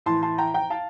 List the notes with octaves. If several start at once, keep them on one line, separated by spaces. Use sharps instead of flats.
A2 E3 A5 C6
A5 C6
G5 A#5
G5 A#5
F5 A5